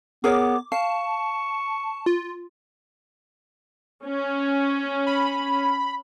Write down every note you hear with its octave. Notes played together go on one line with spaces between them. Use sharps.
B3 G#4 A#4 C#5 D6
F5 A5 C#6
F4
C#4
B5